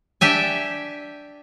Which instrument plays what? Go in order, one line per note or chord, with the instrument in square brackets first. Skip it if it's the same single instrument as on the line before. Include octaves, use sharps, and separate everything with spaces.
[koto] D4 G4 E5 G#5